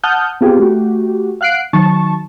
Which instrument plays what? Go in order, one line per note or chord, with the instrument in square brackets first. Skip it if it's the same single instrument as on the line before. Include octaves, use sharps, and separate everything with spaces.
[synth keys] F#5 A5 D#6 F6 G6
B3 C4 F4 G4 G#4
A3 F#4 G4
F5 F#5 F#6 C7 D7
D#3 F#3 A5 C#6